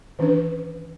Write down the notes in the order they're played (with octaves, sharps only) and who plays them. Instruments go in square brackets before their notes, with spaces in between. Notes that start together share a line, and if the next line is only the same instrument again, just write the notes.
[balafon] D#3 E3 C#4 D4 B4